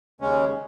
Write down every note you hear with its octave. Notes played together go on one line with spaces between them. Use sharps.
D#2 C#3 G#3 C#4